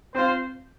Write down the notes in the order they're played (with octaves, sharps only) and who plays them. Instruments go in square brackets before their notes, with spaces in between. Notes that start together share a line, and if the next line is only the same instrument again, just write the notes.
[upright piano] C4 [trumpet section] F4 C5